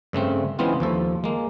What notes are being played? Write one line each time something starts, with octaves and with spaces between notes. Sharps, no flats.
G2 C#3 A3 C4
C#3 E3 G#3 B3 C4 F4
D#2 F3 A4
G#3 A#3